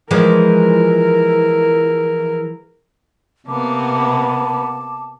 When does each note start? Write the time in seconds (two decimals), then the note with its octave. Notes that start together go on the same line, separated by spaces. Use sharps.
0.11 E3 F3 G#3 E4 A#4
3.48 C3 A#3 B3 A5 D6